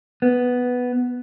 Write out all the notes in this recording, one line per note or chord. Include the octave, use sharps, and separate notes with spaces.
B3